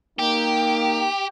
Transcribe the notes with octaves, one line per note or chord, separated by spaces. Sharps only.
A#3 D#4 G4